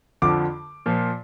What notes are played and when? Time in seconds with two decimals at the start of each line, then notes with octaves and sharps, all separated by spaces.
0.22 F2 D3 F3 D6
0.86 A#2 F3